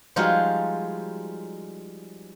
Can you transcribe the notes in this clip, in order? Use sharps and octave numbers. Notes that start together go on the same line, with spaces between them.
F3 G3 G#3 D#4 F4 F#4